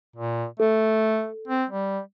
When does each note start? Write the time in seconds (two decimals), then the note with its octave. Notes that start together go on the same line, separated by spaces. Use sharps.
0.16 A#2
0.60 A3 A4
1.48 C4
1.70 G3